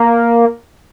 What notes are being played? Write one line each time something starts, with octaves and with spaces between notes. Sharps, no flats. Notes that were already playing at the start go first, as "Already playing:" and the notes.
Already playing: A#3